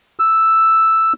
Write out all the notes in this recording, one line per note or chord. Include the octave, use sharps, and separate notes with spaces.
E6